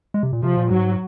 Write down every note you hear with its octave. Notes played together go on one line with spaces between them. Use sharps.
G#3
C3
A#2
C3 F3
A#2
G#2 F#3